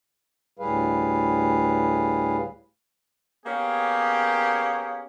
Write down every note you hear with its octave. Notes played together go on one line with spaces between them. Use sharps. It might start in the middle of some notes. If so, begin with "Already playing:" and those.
D2 A2 G3 G#4 B4 F5
A#3 B3 C#4 G4 G#4